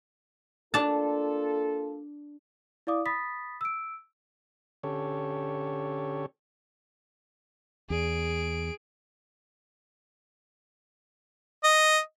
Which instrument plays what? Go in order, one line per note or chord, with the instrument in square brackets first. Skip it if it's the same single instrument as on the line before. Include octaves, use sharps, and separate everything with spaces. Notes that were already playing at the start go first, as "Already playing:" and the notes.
[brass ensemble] A#3 F4 A4 [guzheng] D4 A5
[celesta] E4 D5 F5 D6 D#6
B5 D#6 A6 B6
E6 D7
[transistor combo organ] D3 C#4 G4 A4 C#5
[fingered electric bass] E2 [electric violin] G#4 D7
[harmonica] D#5